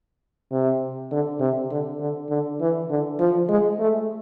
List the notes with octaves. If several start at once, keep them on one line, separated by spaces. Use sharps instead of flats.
C3
D3
C3
D3
D3
D3
E3
D3
F3
G#3
A3